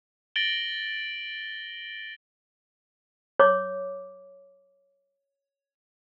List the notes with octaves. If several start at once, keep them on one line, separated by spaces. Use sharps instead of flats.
A6 A#6 D7 F#7 G7
C#5 D6